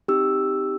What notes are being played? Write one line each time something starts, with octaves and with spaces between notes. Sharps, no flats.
C4 D#4 G4 E6